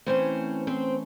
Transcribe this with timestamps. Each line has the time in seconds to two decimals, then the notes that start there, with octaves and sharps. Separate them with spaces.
0.06 E3 A3 C4 C#4 C5
0.67 C4 C5